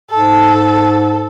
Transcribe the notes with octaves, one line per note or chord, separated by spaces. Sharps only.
G#2 A4